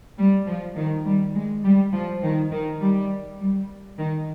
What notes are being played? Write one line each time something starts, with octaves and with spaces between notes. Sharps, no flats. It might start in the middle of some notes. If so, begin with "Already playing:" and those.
G3
F3
D#3
G3
G#3
G3
F3
D#3
D#3
G3
G3
D#3